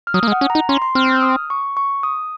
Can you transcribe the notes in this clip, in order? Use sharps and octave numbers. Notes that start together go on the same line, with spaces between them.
F6
F#3 D#6
A#3
G#3
F#5
C#4
A#5
D#4
C#4 C6
C6
C4 F6
F6
D#6
C#6
C#6
D#6